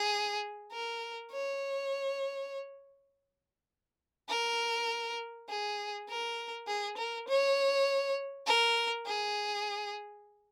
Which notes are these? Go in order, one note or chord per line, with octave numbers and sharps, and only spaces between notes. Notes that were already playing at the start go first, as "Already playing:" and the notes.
Already playing: G#4
A#4
C#5
A#4
G#4
A#4
G#4
A#4
C#5
A#4
G#4